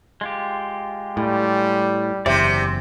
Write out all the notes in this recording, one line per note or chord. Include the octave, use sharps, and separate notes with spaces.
G#3 F4 G4
A2 G3
F#1 E2 C3 C5 D5